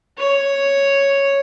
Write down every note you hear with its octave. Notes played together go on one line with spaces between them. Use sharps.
C#5